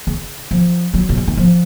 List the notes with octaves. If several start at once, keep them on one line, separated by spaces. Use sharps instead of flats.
C#3
F3
F#3
C3
C#3
D#3
F3